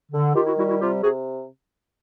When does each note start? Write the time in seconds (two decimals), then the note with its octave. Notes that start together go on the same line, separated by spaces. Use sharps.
0.12 D3
0.34 D#3 F4 G4
0.46 E4 F#4
0.57 G3 E4 F#4
0.69 E4 F#4
0.80 C3 F4 G4
1.02 C3 F#4 G#4